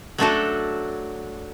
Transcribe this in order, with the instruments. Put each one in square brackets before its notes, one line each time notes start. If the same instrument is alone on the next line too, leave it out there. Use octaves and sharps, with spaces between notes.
[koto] F#3 A3 D4 F#4 A4